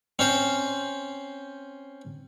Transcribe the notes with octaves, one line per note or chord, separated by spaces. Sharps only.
C4 C#4 C5